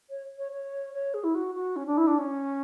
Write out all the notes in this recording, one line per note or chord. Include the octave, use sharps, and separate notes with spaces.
C#5
C#5
C#5
C#5
G#4
E4
F#4
F#4
C#4
D4
E4
D4
C#4